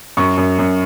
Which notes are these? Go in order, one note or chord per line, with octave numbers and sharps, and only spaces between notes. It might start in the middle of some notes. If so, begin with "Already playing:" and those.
F#2 C#6
F#2
F#2